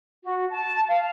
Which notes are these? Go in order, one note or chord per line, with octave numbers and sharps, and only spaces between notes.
F#4
A5
F5